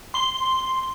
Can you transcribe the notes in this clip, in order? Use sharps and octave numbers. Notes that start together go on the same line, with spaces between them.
C6 G7